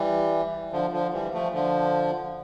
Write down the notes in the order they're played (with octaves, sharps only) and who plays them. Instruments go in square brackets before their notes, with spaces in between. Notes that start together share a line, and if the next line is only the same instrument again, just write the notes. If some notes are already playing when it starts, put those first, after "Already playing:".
Already playing: [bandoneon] E3 G3
D3 F3
D3 F3
E3 G3
F3 A3
D3 F3